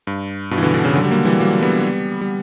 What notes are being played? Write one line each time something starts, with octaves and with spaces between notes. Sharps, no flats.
G2
G2 B2
E3
B2 D3
B2 D3
C#3 E3
D3 F#3
G3
F#3 A#3
E3 G3
F#3 A#3
G3 B3
G3